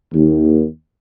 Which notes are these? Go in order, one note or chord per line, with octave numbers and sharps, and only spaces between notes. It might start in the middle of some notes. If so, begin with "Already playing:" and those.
D#2